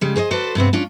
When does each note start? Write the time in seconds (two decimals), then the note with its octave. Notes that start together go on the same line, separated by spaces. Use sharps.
0.01 C#3 G3 G#3
0.16 G#4 C5 C#5 D#5
0.31 F#4 A4 B4 C5 D5
0.55 G2 C3 B3 C4
0.73 C#4 D4 F4